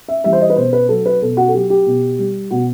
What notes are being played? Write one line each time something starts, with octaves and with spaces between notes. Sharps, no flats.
E5
E3 G3 E5
C5
D#5
B4
B2 C5
B4
F#3 A4
B4
B2 A4
F#4
A4
F#3 G4
G4
B2
G3
B2 F#4